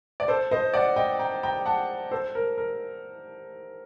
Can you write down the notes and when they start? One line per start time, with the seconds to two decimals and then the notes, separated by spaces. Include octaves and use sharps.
0.20 D5
0.28 A4 C5
0.51 C5 D#5
0.74 D5 F#5
0.96 D#5 G5
1.19 G5 A#5
1.43 G5 A#5
1.65 F#5 A5
2.11 A4 C5
2.35 A#4
2.58 A#4